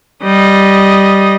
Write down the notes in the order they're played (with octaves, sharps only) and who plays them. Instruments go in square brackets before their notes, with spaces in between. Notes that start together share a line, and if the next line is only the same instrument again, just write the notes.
[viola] G3 D#5